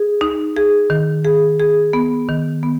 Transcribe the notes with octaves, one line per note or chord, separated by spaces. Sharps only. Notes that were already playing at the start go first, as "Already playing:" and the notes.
Already playing: G#4
D#4
G#4
D#3
G#4
G#4
B3
D#3
B3